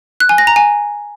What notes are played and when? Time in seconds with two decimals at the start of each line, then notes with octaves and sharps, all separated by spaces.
0.20 F#6
0.29 G#5
0.38 A#6
0.47 A#5
0.56 G#5